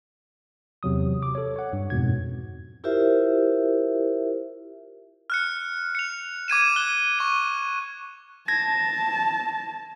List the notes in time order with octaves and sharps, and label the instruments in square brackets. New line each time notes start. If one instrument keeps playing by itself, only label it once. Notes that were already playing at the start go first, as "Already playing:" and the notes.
[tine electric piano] E2 C3 F#3 D#6
D6
A4 C#5
C#5 F#5
G2
F2 G#2 B2 G#6
[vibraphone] E4 F4 G4 A#4 C5 E5
[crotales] F6 F#6 C#7
C#7 F7
D6 G#6 D#7 E7
F#6 G7
C#6 D#7
[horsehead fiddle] A5 [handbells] G#6 A#6